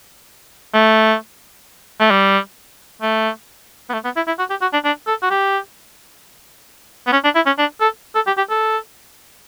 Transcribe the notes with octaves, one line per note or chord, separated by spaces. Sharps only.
A3
A3
G3
A3
B3
A3
B3
E4
E4
F#4
G4
F#4
D4
D4
A4
F#4
G4
B3
C#4
D4
E4
C#4
D4
A4
A4
G4
G4
A4